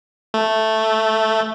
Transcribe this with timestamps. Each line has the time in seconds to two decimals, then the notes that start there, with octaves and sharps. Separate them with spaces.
0.34 A3